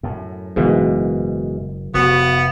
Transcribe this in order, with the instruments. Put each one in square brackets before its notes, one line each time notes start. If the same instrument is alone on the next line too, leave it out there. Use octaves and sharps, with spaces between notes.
[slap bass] F#2 A2
[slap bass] F#1 [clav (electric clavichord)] G#2 B2 E3
[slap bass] F1 [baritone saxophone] B3 [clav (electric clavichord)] F#4